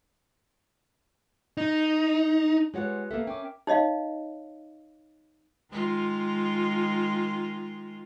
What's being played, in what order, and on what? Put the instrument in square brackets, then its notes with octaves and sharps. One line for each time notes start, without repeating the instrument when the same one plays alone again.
[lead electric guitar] D#4
[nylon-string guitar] G#3 C#5 F#5 [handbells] F4 G4 B4
[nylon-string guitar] A#3 B3 A4 [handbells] A#4 E5
[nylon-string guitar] C#4 [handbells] G5 D6
[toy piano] D#4 C#5 D#5 F5
[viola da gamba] D#3 G#3 F4